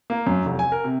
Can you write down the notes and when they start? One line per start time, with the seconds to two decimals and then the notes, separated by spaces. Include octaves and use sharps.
0.10 A#3
0.27 F#2
0.46 F1
0.59 G#5
0.72 A#4
0.84 C3